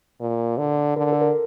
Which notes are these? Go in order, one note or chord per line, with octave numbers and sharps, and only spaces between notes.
A#2
D3
D3 A#4
A4
A#4